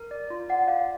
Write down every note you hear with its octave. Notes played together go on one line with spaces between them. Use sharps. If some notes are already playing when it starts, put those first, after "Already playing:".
Already playing: A#4
D5
F4
D5 F#5
D5 F5